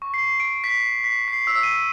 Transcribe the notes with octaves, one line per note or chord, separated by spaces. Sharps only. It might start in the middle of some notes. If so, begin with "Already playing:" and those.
C#6
C7
D7
B6
B6
C7
E6
D#7